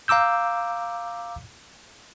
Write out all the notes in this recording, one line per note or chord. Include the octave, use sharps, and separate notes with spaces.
F5 A#5 D6 E6 G6